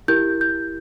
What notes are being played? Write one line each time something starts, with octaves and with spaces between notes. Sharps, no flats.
E4 G4 A#4 G6
G6